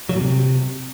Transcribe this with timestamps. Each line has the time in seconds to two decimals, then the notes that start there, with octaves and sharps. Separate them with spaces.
0.09 F#3
0.15 A#2
0.20 C3